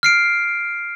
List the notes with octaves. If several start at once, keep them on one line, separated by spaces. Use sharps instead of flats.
F6 C7 D7